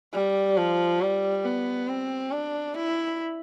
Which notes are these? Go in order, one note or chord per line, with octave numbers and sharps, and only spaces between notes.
G3
F3
G3
B3
C4
D4
E4